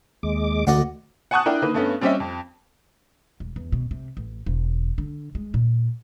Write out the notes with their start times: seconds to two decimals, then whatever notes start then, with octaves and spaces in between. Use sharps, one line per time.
0.23 D#2 G#3 D6
0.67 D2 F#4 D5 D#5
1.31 F#5 G#5 A5 C#6 D#6 F#6
1.46 D4 E4 A#4 D5 G5
1.62 D3 D#3 A#3 B4
1.74 G2 A3 B3 C#4
2.01 G3 C4 C#4 G4 D#5 E5
2.20 F2
3.40 E1
3.56 E2
3.72 B2
3.91 C3
4.17 A1
4.46 E1
4.98 D3
5.35 G#3
5.54 A#2